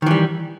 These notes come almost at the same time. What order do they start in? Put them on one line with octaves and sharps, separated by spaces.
D#3 E3 G3